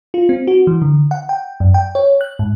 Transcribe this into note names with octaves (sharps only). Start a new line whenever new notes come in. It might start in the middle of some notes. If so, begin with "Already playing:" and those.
F4
C4
F#4
E3
D3
F#5
G5
F#2
G5
C#5
F#6
G#2